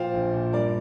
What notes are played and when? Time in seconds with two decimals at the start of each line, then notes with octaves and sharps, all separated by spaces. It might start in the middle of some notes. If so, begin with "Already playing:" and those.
Already playing: A#2 F3 C5 F5 G5
0.14 A#1
0.33 A#2
0.53 G2 A#4 D5